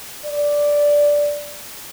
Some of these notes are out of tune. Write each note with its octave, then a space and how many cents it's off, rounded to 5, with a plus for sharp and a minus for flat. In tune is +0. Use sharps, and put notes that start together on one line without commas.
D5 -5